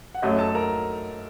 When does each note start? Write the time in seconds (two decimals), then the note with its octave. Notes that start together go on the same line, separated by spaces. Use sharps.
0.15 F#5
0.22 F#2 F#3 A3 D#5
0.38 A4 A5
0.55 A#4 A#5